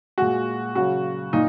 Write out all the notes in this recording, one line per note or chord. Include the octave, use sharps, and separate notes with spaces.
A#2 G#3 F#4
C#3 F#3 F#4
A#2 D#4